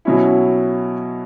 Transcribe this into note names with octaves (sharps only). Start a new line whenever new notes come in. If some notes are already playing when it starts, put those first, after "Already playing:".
B2 F#3 C#4 E4